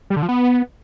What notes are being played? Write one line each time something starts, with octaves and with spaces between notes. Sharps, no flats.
G3
D3
F3
B3